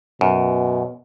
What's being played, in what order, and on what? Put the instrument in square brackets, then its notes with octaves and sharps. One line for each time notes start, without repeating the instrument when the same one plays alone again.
[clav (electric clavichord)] F#2 [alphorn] B2